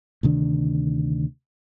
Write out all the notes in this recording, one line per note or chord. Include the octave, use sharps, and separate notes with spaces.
D2 C3 D#3 D4